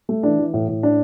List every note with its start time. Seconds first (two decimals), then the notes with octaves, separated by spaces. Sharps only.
0.09 A3
0.23 E3 D4
0.38 E3
0.54 A2
0.68 A2
0.83 D4